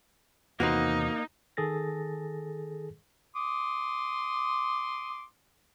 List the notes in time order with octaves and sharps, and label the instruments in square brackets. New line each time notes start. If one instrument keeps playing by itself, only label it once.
[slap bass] E2 C3 D#3 [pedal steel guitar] A#3 [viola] D#4 [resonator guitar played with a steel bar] F#4 B4 C5
[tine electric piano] D#3 G#4 A4 A6 A#6
[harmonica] C6 D6 D#6